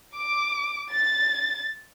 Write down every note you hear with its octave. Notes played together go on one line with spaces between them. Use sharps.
D6
A6